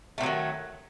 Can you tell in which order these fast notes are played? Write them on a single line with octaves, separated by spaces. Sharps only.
A3 C3 F#3 D#3